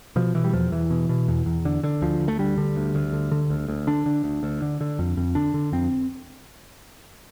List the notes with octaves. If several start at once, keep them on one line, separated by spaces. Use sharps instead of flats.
B2 F3
B2 E3
G3
E2 F3
E2 E3
B2
B2
E2
E2
D3
D3
D2 F3
D2
A3
D3 G3
D3
D2
D2
D3
D3
D2
D2
D3 D4
D3
D2
D2
D3
D3
F2
F2
D3 D4
D3
F2 C4